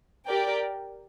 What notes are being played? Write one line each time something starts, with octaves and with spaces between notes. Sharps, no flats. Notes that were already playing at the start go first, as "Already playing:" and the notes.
G4 A#4 D5 G5